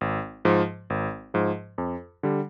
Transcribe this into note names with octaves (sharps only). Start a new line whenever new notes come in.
G#1
G#2 F3
G#1
G#2 F3
F2
D3 G3